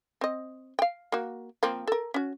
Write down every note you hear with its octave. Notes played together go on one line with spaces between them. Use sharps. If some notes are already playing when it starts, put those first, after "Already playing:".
C4 D#5
F5 G5
A#3 F#4
F3 A#3 C4
A4 A#4
C#4 F#4